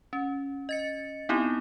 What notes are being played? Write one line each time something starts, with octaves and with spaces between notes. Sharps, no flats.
C#4
D#5 A6 C#7
B3 C4 D#4 E4 G4